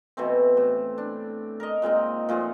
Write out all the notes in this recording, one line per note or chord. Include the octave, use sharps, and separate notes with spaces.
B2 E3 A3 C4
A2
D4
A#4 D#5
A#2 G#3 C4 D#4
A#2 F3 A3 G#4